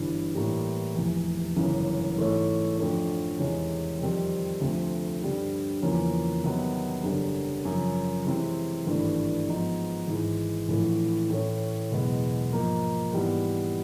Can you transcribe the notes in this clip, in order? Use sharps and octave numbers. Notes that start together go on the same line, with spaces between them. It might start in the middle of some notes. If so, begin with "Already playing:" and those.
Already playing: G1 G2 E3
A2 E3 G3 A#3
F1 E2 C3
G1 F#2 C#3 E3
G#2 E3 A3 C#4
F2 D3 F3 A3 C#4
E2 C3 D#3 G#3 C#4
F2 C3 D#3 G3 C4
D2 C3 F3 A3 C4
G2 D3 G3 C4
E2 C#3 F3 A#3 C#4
C3 D#3 F#3 B3
F#1 F#2 D3 G3
F#2 C#3 F3
C3 E3 G#3 C4
G#1 G2 E3 A3 D4
G#2 F3 G#3 B3 D#4
G#1 G#2 E3 G#3
A#1 A2 E3 A3
A2 E3 A3 C#4
F#1 E2 B2 G#3 B3
G#2 F3 A#3 D#4
G#2 E3 G3 B3